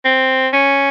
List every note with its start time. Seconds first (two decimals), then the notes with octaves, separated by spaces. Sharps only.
0.05 C4
0.53 C#4